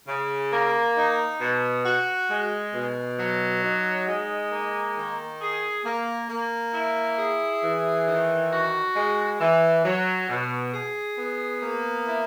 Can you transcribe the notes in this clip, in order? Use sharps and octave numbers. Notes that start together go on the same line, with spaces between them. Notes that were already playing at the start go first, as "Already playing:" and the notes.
C#3
A#3
D#4
B2
F#4
G#3
B2
F#3
D#4
G#3
A#3
D#3
G#4
A#3
A#3
E4
G#4
E3
D#3
F#4
G#3
E3
F#3
B2
G#4
B3
A#3
E4